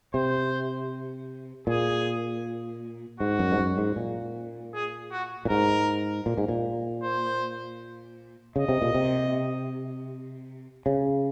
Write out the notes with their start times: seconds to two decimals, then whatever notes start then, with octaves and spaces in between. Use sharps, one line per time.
0.14 C3 C5
1.67 A#2 G#4
3.20 G#2 F#4
3.39 F#2
3.52 G#2
3.58 F#2
3.78 G#2
3.96 A#2
4.74 G#4
5.11 F#4
5.45 A#2
5.49 G#2 A#4
6.26 A#2
6.38 G#2
6.48 A#2
7.03 C5
8.56 C#3 D#5
8.69 C3
8.82 A#2
8.95 C3
10.86 C#3